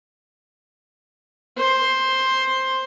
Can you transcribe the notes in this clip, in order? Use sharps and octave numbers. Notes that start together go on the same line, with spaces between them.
C5